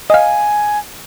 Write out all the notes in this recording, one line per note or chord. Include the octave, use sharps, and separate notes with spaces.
D#5 F5 G#5